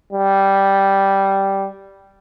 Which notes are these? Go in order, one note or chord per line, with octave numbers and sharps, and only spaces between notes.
G3